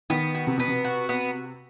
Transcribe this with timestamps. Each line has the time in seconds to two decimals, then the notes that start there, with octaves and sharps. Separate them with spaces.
0.10 D#3 B3
0.35 F#4
0.47 C3
0.57 B2 B3
0.68 C3
0.84 F#4
1.09 B3